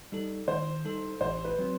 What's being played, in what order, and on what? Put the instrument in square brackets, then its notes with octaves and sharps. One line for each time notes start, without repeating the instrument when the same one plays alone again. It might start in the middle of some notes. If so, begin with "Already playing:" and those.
[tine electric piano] G3 D#4 A4
[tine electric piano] D#3 [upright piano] C5
[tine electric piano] G3 D#4 A4
[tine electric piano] A1 [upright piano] C5
[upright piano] B4
[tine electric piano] F#3 C4